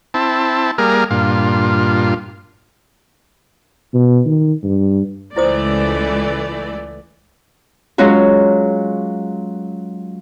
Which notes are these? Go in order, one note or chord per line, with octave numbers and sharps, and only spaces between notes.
C4 E4 A5
G3 A#3 G#4 A#4
G2 A#2 F4
B2
D#3
G2
C#2 E3 A3 E4 C5 D5 D#6
F#3 G#3 C#4 F4 F#4